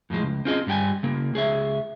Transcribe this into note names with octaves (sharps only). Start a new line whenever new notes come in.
F2 A2 F3 G#3
C#2
C4 C#4 F4 G#4 D#5
G2 G3 G5 G#5
C#3 A#3
C#2 G#4 C#5 E5